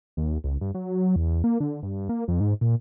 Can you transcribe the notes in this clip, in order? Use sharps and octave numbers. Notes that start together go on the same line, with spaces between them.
D#2
C#2
G2
F#3
E2
A#3
D3
G2
A#3
F2
G#2
A#2